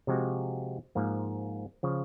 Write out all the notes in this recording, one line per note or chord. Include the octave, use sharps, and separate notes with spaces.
C3 F3 G#3 C4 F#4
G#2 F3 A#3
C#3 F3